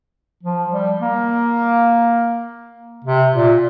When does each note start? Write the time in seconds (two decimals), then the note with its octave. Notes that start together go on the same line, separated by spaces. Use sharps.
0.43 F3
0.72 G3
1.01 A#3
3.04 C3
3.34 A#2